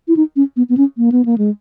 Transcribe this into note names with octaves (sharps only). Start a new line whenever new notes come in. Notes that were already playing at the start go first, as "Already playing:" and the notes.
E4
D#4
C#4
B3
B3
C#4
A#3
B3
A#3
G#3